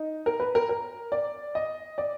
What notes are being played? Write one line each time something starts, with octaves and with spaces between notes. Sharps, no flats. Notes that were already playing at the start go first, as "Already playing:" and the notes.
Already playing: D#4
A#4
B4
A#4
A#4
D5
D#5
D5